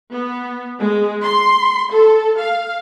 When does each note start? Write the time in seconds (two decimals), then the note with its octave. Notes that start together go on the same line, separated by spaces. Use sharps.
0.12 B3
0.79 G#3
1.23 C6
1.92 A4
2.38 F5